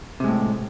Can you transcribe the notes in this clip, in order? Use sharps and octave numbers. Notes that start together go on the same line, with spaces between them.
A2 C3 G#3